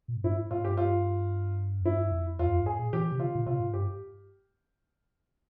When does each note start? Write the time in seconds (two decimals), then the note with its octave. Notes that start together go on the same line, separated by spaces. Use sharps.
0.08 A#2
0.16 G#2
0.24 G2 E4
0.38 G#2
0.51 G#2 F4
0.64 G2 G4
0.77 F4
1.81 F2
1.85 G2 E4
2.12 F2
2.39 E2 F4
2.46 G2
2.53 F2
2.60 G2
2.66 G#2 G#4
2.79 A#2
2.93 E3 G4
3.11 C3
3.19 C#3 F4
3.35 A#2
3.46 C3 F4
3.60 G#2
3.73 G2 G4